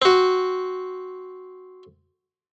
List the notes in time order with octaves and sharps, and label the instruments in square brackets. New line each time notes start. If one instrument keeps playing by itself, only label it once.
[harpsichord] C4 F#4